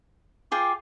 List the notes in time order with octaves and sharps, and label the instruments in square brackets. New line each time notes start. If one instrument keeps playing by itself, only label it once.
[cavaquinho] F4 G#4 G5 [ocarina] D6